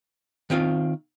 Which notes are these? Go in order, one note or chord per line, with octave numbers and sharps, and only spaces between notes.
D#3 C4 F4 F5